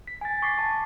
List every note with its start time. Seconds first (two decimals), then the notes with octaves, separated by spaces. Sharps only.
0.07 B6
0.21 G#5 A6
0.42 C#6 D6 A6 B6 C7
0.59 A5